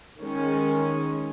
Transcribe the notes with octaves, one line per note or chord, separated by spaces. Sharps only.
D#3 G#3 C#4